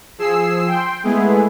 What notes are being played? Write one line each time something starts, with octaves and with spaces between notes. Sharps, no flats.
F3 G#4 E6 C7
G5 C6
G#3 A3 B3 E4 G#4